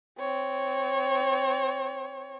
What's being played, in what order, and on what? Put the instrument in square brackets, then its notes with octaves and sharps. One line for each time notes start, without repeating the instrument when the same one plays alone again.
[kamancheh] C4 C#5